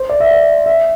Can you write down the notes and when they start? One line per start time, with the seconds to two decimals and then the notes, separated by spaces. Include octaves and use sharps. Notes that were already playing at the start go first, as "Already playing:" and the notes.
Already playing: C5
0.09 D5
0.20 E5
0.31 D5
0.66 E5